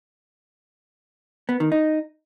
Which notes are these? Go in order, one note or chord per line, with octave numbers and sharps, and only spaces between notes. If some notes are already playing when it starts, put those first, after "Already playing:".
B3
D#3
D#4